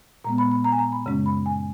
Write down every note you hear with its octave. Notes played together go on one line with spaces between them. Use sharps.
A#2 G#3 B3 A#5
B5
B5
A#5
G#5
A#5
B5
F#2 C#3 G#3 C#4
B5
G#5